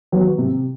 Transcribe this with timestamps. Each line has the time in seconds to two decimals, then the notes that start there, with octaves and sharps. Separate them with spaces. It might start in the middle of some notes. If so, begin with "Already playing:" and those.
0.12 F#3 B3
0.38 C3